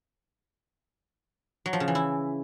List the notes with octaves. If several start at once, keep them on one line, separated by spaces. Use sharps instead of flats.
F#3
F3
C#3
E3
E4